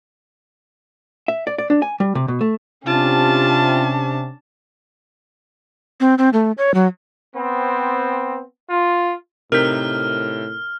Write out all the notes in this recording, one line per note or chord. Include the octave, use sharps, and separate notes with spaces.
E5
D5
D5
D4
G#5
G3
C3
B2
A3
C3 C#4 D4 F4 A5
C4
C4
A3
C#5
F#3
B3 C4
F4
A2 C3 D#4 A#4 F6 G6 B6